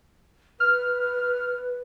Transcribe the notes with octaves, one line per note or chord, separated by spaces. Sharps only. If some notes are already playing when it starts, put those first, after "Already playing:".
B4 F6